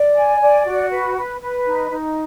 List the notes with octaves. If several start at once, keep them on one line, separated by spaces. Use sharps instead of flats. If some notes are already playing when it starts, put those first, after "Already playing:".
Already playing: D5
G#5
D5
F#4
B4
B4
B4
D#4
D#4